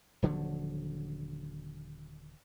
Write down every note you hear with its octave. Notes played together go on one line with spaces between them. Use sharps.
D#1 D3 F3 F#3